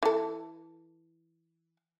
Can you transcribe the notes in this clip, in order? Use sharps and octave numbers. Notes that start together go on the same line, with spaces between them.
E3 A4